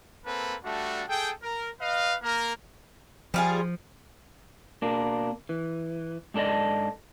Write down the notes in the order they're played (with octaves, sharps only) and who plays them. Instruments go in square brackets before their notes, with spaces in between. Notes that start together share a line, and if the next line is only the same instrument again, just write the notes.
[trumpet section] A#3 C4 A4 B4
G3 A3 D4 F#4
G#4 A4 G5
A#4
B4 D#5 F5
A#3 A#4
[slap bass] F3 [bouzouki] G3 F4 G#4
[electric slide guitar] B2 A#3 D4
E3
G#2 D4 A4 D5 D#5